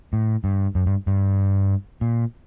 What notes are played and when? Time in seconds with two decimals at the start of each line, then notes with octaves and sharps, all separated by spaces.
0.13 A2
0.44 G2
0.75 F#2
0.86 G2
1.07 G2
2.01 A#2